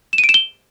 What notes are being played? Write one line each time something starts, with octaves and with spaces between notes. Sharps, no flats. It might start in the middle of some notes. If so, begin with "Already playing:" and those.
E7
D#7
D7
E7
G7